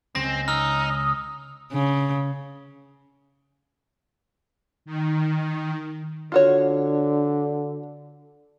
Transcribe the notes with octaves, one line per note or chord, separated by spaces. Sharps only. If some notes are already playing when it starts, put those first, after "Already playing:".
C#2 C4 C#4 A#6
D#4 E6 F6
D#6
C#3
D#3
D3 F4 F#4 C#5